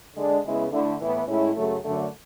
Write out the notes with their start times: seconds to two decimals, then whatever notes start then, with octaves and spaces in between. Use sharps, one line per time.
0.15 D3 G#3 D4
0.44 C#3 G#3 B3 E4
0.72 D3 A3 E4
1.00 A2 E3 B3 E4
1.28 A2 G#3 C#4 E4
1.56 F#2 C#3 F#3 A3
1.84 F#2 D3 A3